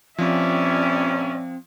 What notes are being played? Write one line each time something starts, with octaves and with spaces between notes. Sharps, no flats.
G2 A#2 F3 C4 C#4 D5 E5